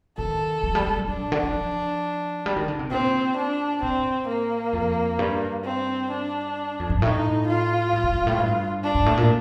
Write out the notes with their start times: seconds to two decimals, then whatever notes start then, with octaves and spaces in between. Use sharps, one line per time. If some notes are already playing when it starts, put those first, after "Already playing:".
0.18 D#3 A4
0.63 F3
0.75 G3
0.86 G3
0.98 G3
1.09 G3 D4
1.20 A#2
1.32 D3
1.43 D#3
1.54 F3
2.46 G3
2.56 D#3
2.68 D3
2.79 C3
2.91 A#2 C4
3.37 D4
3.82 A2 C4
4.28 A#3
4.73 F2
5.19 G2
5.64 C4
6.10 D4
6.79 F2
6.90 G2
7.01 A2 D#4
7.47 F4
7.93 G2
8.03 G2
8.15 G2
8.27 A2
8.38 G2
8.84 D4
8.95 G2
9.06 A2
9.17 A#2